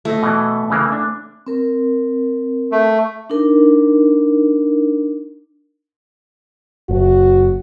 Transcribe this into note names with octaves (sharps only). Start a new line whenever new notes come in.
A3 E4 D#5
B2 E3
C#3 E3 A#3
D4
C4 A#4
A3
D4 D#4 A#4
F#1 F#4